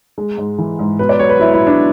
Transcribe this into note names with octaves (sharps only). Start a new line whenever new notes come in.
G#3
G#2
E3
G#2
B2 B4
D5
F#3 C#5
B4
F#3 E4
E4
B2
D4